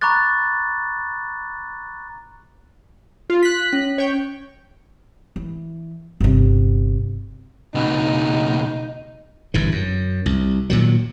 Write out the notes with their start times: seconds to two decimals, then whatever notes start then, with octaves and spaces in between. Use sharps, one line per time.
0.01 A#5 B5 C#6 D6 F#6 A6
3.30 F4
3.43 F#6 B6
3.73 C#4
3.98 C#5 G5
5.36 E3
6.20 G1 C3
7.75 C#2 B2 D#4
9.54 G1 G2 E3
9.72 F#2
10.26 C2
10.70 A#2 D#3 F#3